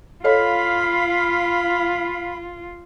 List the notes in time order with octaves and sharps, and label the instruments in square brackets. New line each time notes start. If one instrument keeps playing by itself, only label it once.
[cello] F4 [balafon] A4 C#5 D#5 [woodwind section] F5 B5